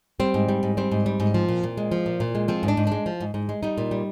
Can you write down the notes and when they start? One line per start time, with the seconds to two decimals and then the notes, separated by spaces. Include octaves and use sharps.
0.20 G3 C4
0.34 G#2
0.49 G3
0.63 G#2
0.77 G3 C4
0.91 G#2
1.06 G3
1.20 G#2
1.34 F3
1.49 A#2
1.63 A#2
1.77 G#3
1.91 F3
2.06 A#2
2.20 A#2
2.35 G#3
2.48 F3 C4
2.63 G#2
2.68 D4
2.77 G#2
2.87 G#3 D4
3.06 F3
3.20 G#2
3.34 G#2
3.49 G#3
3.63 G3 D#4
3.78 A#2
3.91 G3